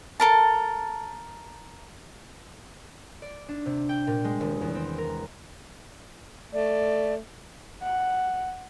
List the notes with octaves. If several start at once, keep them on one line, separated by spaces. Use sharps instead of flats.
A4 A#4 A5
D5
D4
C3
G5
A#2
G#3
D#1
E2
C4
A#4
A3 D5
F#5